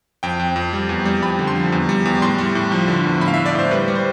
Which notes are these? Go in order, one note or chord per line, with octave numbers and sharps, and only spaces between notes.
F2 G5
F2
F2
G3
E2
G3
F2 B5
D3
C6
F3
E2
G3
E2
A2 C6
G3
A2
F3
D3
E2
A2 B5
F5
E5
A2
D5
A2 C5
G3 B4
G3
C5